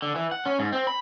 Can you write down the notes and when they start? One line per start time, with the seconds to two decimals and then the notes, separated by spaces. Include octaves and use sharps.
0.02 D3
0.16 E3
0.32 F#5
0.46 C#4
0.59 G#2
0.72 C4
0.87 B5